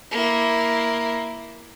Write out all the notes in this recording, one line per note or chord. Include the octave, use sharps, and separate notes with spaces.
A#3 E4